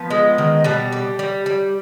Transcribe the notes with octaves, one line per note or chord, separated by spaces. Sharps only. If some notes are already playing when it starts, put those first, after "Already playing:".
Already playing: F3 B3
G#3
D#3
B2 G3 G4
G3
G3
G3